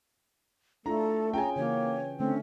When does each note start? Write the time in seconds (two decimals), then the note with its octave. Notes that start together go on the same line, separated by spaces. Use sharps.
0.86 A3 D4 E4 F4 A4 A#5
1.34 C#4 F4 G#4 G5 G#5 A#5
1.56 C#3 E3 A#3 F#4 C#5
2.20 D3 A3 C4 C#4